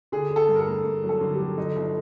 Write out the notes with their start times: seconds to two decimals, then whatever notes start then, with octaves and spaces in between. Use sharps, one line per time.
0.12 D3 G#4
0.31 D3
0.36 A4
0.49 G2
0.56 A#4
0.60 A4
0.67 A#3
0.85 G2
1.03 F#3
1.09 A4
1.21 D3
1.34 G4
1.39 F#3
1.57 D3 D#4
1.76 G1